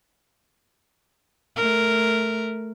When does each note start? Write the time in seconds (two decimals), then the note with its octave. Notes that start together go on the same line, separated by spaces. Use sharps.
1.56 A3 A#4